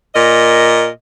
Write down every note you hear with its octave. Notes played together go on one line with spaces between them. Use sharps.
A#2 A#4 D#5